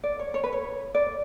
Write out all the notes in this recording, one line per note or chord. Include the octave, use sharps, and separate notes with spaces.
D5
C#5
C#5
B4
C#5
D5